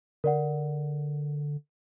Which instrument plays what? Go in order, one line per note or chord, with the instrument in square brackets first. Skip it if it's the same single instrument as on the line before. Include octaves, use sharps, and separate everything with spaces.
[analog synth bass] D3 [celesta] A#4 D5 F#5